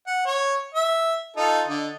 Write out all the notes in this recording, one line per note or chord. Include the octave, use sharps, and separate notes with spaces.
F#5
C#5
E5
D#4 F4 A4
D3 D#5